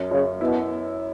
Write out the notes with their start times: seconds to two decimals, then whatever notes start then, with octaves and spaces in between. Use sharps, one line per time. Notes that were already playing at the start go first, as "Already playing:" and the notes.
Already playing: F#2
0.11 F#2 C#3
0.40 B2 E4